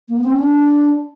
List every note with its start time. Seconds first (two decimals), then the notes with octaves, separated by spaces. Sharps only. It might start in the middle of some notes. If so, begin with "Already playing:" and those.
0.08 A#3
0.16 B3
0.24 C4
0.31 C#4
0.39 D4